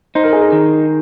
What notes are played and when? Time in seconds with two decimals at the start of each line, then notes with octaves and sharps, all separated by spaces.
0.15 D#4 C5
0.24 A#4
0.33 G#4
0.41 A#4
0.52 D#3